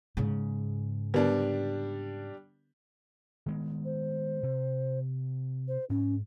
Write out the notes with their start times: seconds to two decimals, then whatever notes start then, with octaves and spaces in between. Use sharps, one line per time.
0.17 G#2 C#3
1.14 D3 G3 B3 D4 A#4
3.46 D#3 G#3 B3
3.85 C5
4.43 C3
5.68 C5
5.90 G#2 C#4